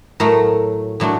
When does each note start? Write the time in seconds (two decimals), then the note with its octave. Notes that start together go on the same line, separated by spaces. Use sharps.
0.20 A2 F#3 A3 A#4
1.00 A2 F#3 A3 D4